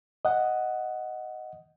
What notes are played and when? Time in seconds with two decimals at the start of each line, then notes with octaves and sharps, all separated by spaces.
0.25 D#5 F#5